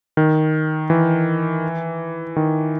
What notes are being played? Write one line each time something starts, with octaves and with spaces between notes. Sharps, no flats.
D#3
E3
D#3